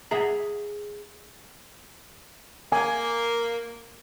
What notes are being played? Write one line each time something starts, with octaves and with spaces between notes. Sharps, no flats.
G#4 E5 F#5 A#5
A#3 G#5